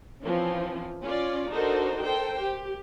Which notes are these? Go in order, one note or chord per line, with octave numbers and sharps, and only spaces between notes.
E3 F3 C4 C#4
C#4 F4 D5
D4 D#4 F#4 A4 A#4 C5
A4 A#4 C5 G5
G4